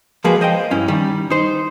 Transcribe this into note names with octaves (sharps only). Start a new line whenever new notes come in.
F3 G#3 A#3 F#4 G#4 B4
C5 D#5 F5 G5
G2 C#4 E4
D#3 G3
D#4 C5